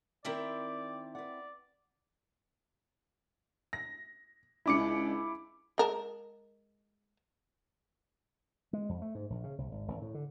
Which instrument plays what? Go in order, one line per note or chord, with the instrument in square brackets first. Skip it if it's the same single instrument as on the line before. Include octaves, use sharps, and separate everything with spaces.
[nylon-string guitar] D#3 A#4 [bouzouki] C4 E4 G5 [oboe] D5
[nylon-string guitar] B4 F#5 [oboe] D5
[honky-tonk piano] A#6
[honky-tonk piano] C#2 D4 D#5 [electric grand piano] E4 D6 C#7
[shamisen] G#3 A#4 A5
[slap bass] G#3
F2
A3
G#2
A#1
C#3
C2
G#1
G#1
A2
D3